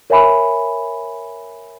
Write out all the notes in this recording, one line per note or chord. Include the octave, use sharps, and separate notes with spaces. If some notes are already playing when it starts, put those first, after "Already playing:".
A#4 C#5 E5 G#5 B5